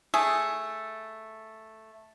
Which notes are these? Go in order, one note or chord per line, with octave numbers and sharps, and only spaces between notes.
A3 G#4